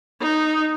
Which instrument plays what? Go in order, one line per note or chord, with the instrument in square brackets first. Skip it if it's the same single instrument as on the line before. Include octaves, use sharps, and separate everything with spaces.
[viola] D#4